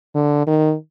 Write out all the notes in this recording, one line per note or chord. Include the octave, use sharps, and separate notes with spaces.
D3
D#3